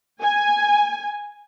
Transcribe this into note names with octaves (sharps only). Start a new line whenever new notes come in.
G#5